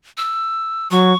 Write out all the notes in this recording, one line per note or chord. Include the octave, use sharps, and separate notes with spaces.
E6
F#3 C#6